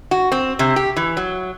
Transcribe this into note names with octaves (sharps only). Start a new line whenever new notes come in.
F#4
C4
C3
G4
E3
F#3